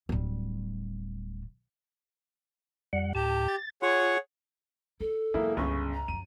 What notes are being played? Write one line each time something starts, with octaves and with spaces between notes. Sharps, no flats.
D1 G3
F2 G3 F#5
D2 A2 G4 A5
A6
F4 G#4 C#5 F#5
E4 A4
E1 F#3 A#3 E4
G1 C#2 C#3 C#6
A#5
F#2 F3 D#7